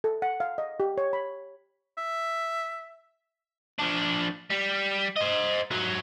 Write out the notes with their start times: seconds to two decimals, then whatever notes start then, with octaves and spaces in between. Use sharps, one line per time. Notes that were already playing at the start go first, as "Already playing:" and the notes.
0.04 A4
0.22 F#5
0.40 F5
0.58 D#5
0.80 G4
0.98 C#5
1.13 B5
1.98 E5
3.79 F3 D4
4.50 G3
5.16 C5 D#5
5.71 G#2 F#3